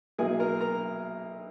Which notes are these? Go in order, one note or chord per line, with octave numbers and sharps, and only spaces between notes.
B1 B2 F#3 A#3 E4 G#4 G#5
A#4 A#5
A#4 A#5